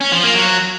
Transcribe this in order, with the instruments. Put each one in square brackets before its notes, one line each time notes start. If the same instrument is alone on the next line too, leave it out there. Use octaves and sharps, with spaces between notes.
[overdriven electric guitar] C#4
F3
A#3
F#3